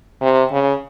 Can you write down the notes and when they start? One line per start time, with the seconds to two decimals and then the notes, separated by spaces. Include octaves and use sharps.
0.22 C3
0.52 C#3